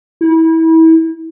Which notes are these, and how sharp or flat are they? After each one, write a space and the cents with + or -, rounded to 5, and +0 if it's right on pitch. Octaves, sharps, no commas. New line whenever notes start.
E4 -30